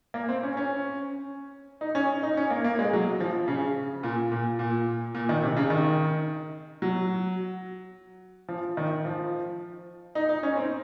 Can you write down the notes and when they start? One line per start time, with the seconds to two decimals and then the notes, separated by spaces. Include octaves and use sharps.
0.14 A#3
0.29 C4
0.43 C#4
0.57 C#4
1.81 D#4
1.95 C#4
2.23 D#4
2.37 C#4
2.50 A#3
2.64 A#3
2.79 G#3
2.93 F#3
3.20 F3
3.48 C#3
4.03 A#2
4.32 A#2
4.59 A#2
5.15 A#2
5.29 D#3
5.42 C3
5.57 C#3
5.70 D#3
6.82 F#3
8.49 F3
8.77 D#3
9.05 F3
10.15 D#4
10.29 D#4
10.43 C#4
10.57 C4